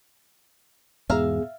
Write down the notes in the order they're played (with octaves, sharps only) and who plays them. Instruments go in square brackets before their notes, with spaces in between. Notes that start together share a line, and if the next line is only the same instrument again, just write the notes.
[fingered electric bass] E2 G#2 B2 [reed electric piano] B3 G#4 [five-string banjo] E5 F5 A#5